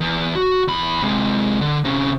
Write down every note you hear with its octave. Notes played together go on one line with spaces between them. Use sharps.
E2
F#4
E2 B5
C3 G#3
D3
C3 C#4